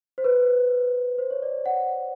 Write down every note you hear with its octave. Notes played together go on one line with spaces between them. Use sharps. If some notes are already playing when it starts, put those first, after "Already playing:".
C5
B4
C5
C#5
D5
F#5